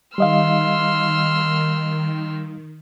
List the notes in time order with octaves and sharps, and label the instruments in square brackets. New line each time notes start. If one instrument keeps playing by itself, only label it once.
[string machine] D#3 [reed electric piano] G3 D#5 F5 [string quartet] C6 E6 F6